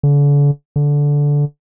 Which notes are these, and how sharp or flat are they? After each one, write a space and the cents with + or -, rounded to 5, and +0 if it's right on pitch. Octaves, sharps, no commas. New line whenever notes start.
D3 -40
D3 -15